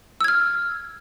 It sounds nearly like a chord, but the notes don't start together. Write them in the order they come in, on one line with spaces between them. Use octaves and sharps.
E6 G#6 F6